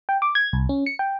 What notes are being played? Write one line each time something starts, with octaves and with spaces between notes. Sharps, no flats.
G5
D6
G#6
C2
C#4
C#7
G5